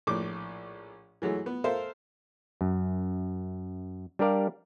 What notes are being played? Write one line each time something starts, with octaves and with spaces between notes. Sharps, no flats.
A#1 A2 D6
E3 F#3 G#3 A3
B3
A4 A#4 C5 E5 F5
F#2
G3 D4 G4 A#4 D5 F5